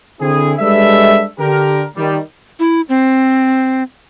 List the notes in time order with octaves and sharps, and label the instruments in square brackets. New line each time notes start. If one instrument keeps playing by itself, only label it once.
[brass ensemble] D3 C4 E4 G#4
G3 G#3 D4 A4 B4 E5
D3 G4 A#4
D#3 G3
[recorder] E4
C4